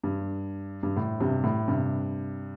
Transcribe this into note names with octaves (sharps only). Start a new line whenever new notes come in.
G2
G2
A2
G2 C3
A2
G2 C3